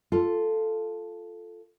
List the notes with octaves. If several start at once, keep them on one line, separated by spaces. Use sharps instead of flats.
F4 A4